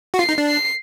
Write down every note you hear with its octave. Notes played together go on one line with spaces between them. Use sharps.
F#4
F4 C7
D#4
D4
C7